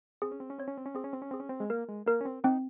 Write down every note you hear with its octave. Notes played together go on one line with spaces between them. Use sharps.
C4 G#4
C#4
C4
C#4
C4 C#5
C#4
C4
C#4
C4 G#4
C#4
C4
C#4
C4 G#4
C#4
C4
G#3
A#3 A#4
G#3
A#3 A#4
C#4
C4
C4 D#4